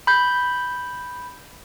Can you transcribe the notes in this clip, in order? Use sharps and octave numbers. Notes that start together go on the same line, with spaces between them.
B5 G6